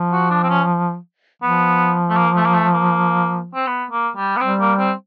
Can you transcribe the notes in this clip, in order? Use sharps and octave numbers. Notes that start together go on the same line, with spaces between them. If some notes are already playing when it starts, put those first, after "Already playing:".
Already playing: F3
F#4
D4
C4
C#4
F3 B3
A3
A#3
A3
A#3
A3
A#3
C4
B3
A#3
G3
B3
G3 C4
A#3
C4